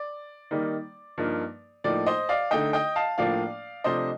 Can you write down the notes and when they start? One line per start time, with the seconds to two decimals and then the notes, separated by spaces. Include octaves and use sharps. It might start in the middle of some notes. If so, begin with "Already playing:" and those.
Already playing: D5
0.51 D#3 G3 A#3 D#4
1.18 G2 F3 A#3 D#4
1.84 A2 F3 A#3 D#4 D5
2.06 C5 D#5
2.29 D5 F5
2.51 D3 A3 D#4 D#5 G5
2.73 D#5 G5
2.96 F5 A5
3.18 A2 F3 A#3 D4 D5 F5
3.84 C3 F3 A3 D4 C5 D#5